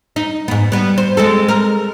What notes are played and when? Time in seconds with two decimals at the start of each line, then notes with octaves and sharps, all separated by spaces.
0.16 D#4
0.48 G#2 B3
0.72 G3 B3
0.98 C5
1.17 G#3 C4 A4
1.49 A#4